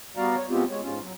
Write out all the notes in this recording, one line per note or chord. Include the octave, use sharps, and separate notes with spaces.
G3 B3 F#4 D5 F5 A#5
C#5
B2 G#3 B3 C4 F4 G4
G#3 C#5
G#2 G#3 C#4 F4
F#3